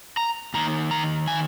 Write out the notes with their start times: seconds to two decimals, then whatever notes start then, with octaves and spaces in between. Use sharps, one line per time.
0.17 A#5
0.54 G#2 D#3 A#3 A#5
0.91 A#5
1.27 G#5